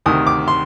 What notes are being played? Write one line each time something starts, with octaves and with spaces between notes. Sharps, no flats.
D2 C3 D#3 D#6
D6
C6